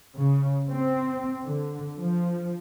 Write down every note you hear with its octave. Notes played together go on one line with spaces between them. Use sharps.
C#3
C4
D3
F3